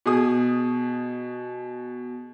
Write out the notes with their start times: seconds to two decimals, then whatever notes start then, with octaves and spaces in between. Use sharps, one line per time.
0.06 B2 G#4 D#6